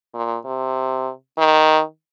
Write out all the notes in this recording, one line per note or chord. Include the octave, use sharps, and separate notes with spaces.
A#2
C3
D#3